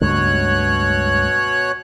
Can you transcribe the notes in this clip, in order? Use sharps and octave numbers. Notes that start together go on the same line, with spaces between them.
C#2 G2 B2 A3 C#5 F#6